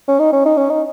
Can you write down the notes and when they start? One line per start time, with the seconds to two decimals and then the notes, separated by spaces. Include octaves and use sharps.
0.08 C#4
0.19 D#4
0.32 C#4
0.45 D#4
0.57 C#4
0.69 D#4